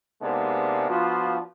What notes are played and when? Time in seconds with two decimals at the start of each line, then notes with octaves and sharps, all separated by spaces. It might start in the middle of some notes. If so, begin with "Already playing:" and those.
0.22 G#2 C3 G#3 A#3 B3 D4
0.90 F3 B3 D4 F4 F#4